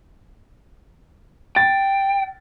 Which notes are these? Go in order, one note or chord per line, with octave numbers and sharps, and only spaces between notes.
G5 A6